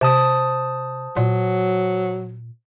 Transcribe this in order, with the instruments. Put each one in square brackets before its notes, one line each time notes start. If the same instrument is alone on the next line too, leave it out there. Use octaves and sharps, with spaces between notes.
[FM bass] C3 [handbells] C5 A5 D#6
[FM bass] A#2 [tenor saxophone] F#3